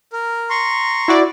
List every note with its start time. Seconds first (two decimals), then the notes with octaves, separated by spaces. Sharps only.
0.13 A#4
0.50 A#5 C6 C#6
1.08 E4 F#4 D5